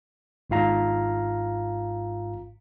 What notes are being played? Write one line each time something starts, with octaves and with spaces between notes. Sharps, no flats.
G#1 G#2 F4 F5 A#5